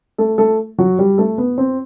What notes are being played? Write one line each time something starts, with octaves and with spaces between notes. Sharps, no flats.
A3 A4
A3 A4
F#3 F#4
G3 G4
A3 A4
B3 B4
C4